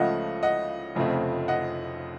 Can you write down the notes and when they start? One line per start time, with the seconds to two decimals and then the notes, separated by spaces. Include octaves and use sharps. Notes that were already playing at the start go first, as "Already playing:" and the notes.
Already playing: C#2 C#3 F3 A3 D#5 F#5
0.43 D#5 F#5
0.95 F1 F2 C#3 A3 C4
1.48 D#5 F#5